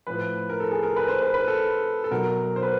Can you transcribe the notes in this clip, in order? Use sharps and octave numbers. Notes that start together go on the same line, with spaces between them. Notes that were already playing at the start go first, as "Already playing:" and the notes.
A2 F3 B4
A#4
A4
G#4
A#4
B4
C5
B4
B4
A4
A4
B2 F#3 A#4
C5
B4